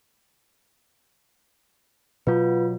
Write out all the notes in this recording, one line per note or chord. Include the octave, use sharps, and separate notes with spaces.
B2 F#3 B3 F4 B4